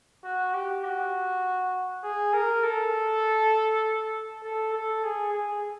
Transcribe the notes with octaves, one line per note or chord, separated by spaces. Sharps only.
F#4
G4
F#4
G#4
A#4
A4
A4
A4
G#4
G#4